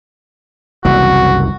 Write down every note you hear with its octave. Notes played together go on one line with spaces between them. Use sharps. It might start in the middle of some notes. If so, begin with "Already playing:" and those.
F#1 C2 E3 F#4